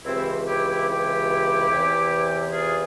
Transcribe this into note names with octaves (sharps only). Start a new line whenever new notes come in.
C#2 C3 E3 C4 E4
E4 G4
E4 G4
E4 G4
E2 C3 E3
F4 G#4